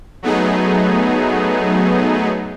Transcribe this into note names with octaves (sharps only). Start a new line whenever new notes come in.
F#3 A3 B3 D#4 G#4